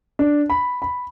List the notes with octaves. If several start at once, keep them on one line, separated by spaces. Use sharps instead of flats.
D4
B5
B5